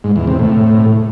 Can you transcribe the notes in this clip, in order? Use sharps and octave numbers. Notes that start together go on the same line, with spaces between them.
G#2
E2
C3
A2